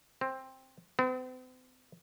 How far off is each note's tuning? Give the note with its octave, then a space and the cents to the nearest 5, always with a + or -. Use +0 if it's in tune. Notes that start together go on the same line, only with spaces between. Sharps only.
C4 +10
C4 -45